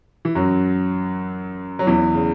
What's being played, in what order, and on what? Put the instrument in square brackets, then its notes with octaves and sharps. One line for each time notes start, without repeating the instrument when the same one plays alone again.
[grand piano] E3
F#2 F#3
F#3
E2 E3
C#3